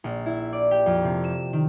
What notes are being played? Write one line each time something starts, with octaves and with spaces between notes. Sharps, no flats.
A#1
E4
D5
G4
F2
C3
E7
D#3